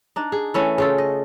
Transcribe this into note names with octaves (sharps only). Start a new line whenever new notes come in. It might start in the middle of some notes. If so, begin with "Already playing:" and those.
D4 D#4
G#4
E3 A3 C#4 E4
C#3 F4 A4
D#5